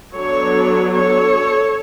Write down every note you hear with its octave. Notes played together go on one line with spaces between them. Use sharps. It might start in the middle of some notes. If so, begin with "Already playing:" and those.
F#3 B3 D4 A4 C#5
A4 C#5